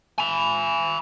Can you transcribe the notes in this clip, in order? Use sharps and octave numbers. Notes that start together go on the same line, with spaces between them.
G#5 B5